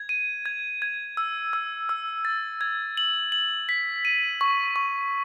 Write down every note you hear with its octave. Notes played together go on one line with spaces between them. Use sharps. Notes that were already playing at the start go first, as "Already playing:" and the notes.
Already playing: G#6
D#7
G#6
G#6
E6
E6
E6
A6
G#6
F#7
F#7
B6
D#7
C#6
C#6